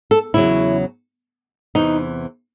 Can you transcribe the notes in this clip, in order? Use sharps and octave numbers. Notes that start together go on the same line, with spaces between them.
A4
E2 C#3 F#3 E4
E2 C3 E3 D#4